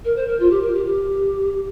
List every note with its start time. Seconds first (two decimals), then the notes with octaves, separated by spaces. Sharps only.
0.05 A#4
0.16 C5
0.28 A#4
0.40 F4
0.51 G4
0.62 A#4
0.74 G4
0.86 G4